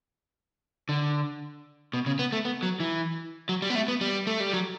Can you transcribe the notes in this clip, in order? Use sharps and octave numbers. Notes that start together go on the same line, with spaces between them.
D3
B2
C#3
B3
A3
B3
F#3
E3
F#3
G3
B3
A3
B3
G3
A3
G3
F#3